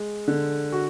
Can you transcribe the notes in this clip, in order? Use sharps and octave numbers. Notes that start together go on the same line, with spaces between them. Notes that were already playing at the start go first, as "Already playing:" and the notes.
Already playing: G#3
D3
F#4